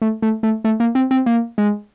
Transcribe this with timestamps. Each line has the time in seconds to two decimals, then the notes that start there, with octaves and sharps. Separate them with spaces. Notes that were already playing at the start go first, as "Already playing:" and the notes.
0.02 A3
0.22 A3
0.43 A3
0.65 A3
0.80 A#3
0.95 C4
1.11 C4
1.26 A#3
1.58 G#3